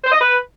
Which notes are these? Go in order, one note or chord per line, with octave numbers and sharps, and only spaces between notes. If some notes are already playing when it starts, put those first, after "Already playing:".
C5
D#5
B4